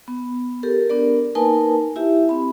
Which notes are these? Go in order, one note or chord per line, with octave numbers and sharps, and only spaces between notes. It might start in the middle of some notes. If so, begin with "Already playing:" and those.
B3
G4 A4 A#4
B3 D4 A#4 D5
A#3 D#4 A#4 B4 G#5 A5
E4 G4 E5
C4 B5